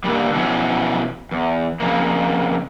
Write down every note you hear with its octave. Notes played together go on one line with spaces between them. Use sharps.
A#2 D3 G3
B2 E3 F3 C#4
E2
F2 C#3 A#3